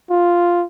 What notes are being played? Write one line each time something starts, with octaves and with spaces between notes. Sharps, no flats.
F4